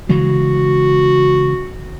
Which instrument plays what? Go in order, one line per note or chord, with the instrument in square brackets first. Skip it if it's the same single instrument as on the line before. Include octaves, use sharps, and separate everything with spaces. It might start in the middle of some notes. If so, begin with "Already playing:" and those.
[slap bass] C#3 E3 G#3 [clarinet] F#4